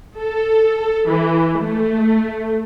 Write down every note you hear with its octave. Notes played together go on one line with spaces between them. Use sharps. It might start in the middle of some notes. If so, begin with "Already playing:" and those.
A4
E3
A3